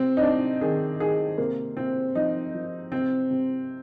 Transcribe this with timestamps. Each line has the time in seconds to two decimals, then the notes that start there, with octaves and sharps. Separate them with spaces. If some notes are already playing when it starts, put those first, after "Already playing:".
Already playing: C3 C4
0.17 D#4
0.22 C3 D4
0.61 D#3 G#4
1.00 D#3 G#4
1.38 C3 A#3
1.77 C3 C4
2.15 F3 D#4
2.54 F3
2.92 C3 C4
3.31 C3